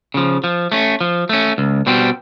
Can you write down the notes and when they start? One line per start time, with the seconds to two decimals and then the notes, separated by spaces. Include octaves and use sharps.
0.14 C#3 F3
0.44 F3
0.72 A3 C#4
1.01 F3
1.29 A3 C#4
1.58 C#2
1.87 B2 G3 C4